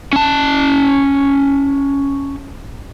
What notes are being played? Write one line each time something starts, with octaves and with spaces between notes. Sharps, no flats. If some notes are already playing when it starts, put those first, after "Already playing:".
C#4 A5